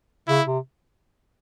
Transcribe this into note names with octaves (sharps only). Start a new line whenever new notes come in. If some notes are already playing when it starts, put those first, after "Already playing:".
C#3 E4
C3